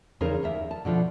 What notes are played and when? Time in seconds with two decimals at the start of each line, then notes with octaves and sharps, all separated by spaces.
0.21 E2 C#3 D#4 G#4 A#4 C5
0.43 D#2 A#4 E5
0.71 A5
0.85 B2 D3 F3